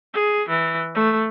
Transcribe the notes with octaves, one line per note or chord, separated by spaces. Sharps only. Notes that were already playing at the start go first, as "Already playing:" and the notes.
G#4
E3
A3